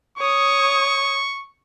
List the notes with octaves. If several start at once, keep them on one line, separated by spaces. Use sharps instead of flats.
C#5 C#6 D#6